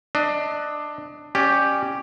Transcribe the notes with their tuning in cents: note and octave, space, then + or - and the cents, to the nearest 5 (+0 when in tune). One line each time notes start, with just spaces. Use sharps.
D4 +15 D#5 +30
C#4 +0 G4 +0 D5 +35